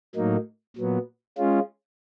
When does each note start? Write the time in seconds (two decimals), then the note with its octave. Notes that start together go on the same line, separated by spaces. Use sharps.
0.15 A2 F#3 A#3 D#4
0.76 A#2 F#3 B3
1.38 G#3 C#4 F4